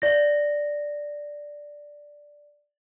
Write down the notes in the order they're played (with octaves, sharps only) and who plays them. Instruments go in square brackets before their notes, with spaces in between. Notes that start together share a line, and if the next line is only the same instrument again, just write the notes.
[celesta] D5 A#6